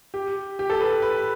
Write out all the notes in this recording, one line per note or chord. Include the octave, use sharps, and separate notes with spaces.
G4
G4
A4
B4
B4